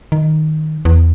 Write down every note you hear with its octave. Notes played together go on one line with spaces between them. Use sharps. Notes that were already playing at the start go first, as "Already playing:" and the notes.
D#3
E2